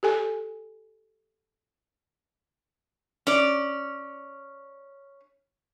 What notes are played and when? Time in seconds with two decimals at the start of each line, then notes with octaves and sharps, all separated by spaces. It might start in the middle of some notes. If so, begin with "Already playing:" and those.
0.03 G4 A4 G#5
3.27 C#4 D5